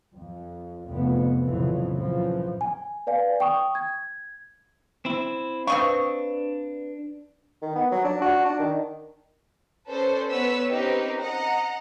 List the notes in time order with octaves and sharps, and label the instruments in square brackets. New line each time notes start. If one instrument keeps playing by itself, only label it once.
[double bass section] F2
F1 F2 B3
A#1 F2 C#3 E3 F#3
A#1 F#2 C#3 E3 F3
[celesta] G#5
B4 D5 F5 G#5
G5 C#6 D#6
G#6
[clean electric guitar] C4 E4
[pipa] C4 D#5 C#6 [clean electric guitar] D4 [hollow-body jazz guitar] B4 F5
[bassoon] D#3
B3
F#3
D4
F#4
D4
D#3
[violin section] C#4 A4 B4 C5 D5
B3 B4 C#5 E6 B6
C4 C#4 D#4 G4 A#4 B4
D#5 F#5 A#5